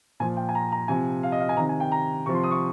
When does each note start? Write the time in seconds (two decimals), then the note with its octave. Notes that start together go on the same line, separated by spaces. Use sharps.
0.20 A#2 F3 G#5
0.37 G5
0.49 G#5
0.55 A#5
0.72 A#5
0.88 C3 F3 G#5
1.23 F5
1.32 D#5
1.40 F5
1.49 G#5
1.57 C3 D#3 A#5
1.69 G#5
1.80 G5
1.92 A#5
2.26 C3 F3 C#6
2.35 C6
2.44 D#6
2.51 C#6